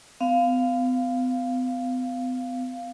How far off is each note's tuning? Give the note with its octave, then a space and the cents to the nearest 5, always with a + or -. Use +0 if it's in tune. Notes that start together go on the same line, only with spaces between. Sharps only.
B3 +45 F5 +0